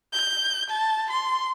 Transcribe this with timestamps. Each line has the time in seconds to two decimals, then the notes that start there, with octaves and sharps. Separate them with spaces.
0.13 G6
0.70 A5
1.10 C6